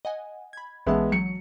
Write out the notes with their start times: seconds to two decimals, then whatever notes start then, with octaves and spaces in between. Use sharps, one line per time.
0.05 D#5 F#5 G#5
0.53 B5 G#6
0.86 A#1 E3 G#3 B3 E5 A5
1.12 F#3 C#7